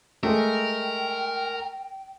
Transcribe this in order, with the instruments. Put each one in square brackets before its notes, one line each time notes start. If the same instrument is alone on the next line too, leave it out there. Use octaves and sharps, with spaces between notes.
[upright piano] G#3 A3 [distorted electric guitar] A#4 [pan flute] G5